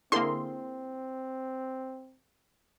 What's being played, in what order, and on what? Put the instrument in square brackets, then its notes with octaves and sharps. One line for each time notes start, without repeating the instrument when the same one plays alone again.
[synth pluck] D3 A#3 [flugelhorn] C4 [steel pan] E4 G#4 A#4 [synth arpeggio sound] C6